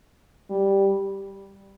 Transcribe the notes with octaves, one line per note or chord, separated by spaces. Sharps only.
G3